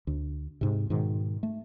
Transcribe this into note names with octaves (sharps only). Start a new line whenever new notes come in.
D2
G#2 C3
G#2 B2 D#3
A3